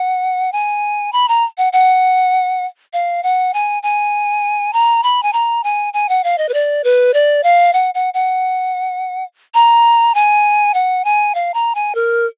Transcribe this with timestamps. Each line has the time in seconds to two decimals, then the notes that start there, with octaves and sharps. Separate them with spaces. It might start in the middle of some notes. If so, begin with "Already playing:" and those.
Already playing: F#5
0.52 G#5
1.13 B5
1.28 A#5
1.58 F#5
1.73 F#5
2.93 F5
3.23 F#5
3.54 G#5
3.83 G#5
4.73 A#5
5.03 B5
5.23 G#5
5.33 A#5
5.64 G#5
5.94 G#5
6.09 F#5
6.24 F5
6.38 D#5
6.49 B4
6.54 D5
6.84 B4
7.14 D5
7.43 F5
7.73 F#5
7.94 F#5
8.14 F#5
9.54 A#5
10.15 G#5
10.74 F#5
11.05 G#5
11.35 F5
11.54 A#5
11.75 G#5
11.95 A#4